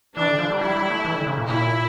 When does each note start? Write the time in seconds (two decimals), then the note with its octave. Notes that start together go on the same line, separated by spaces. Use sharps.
0.16 E3 D4
0.27 D3
0.39 F3
0.50 G3
0.61 G3 E4
0.76 G3
0.90 A3
1.05 E3
1.15 D3
1.27 C#3
1.38 A#2
1.49 A#2 E4